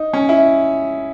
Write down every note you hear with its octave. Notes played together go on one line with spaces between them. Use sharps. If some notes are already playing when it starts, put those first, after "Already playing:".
Already playing: D#4
C#4
E4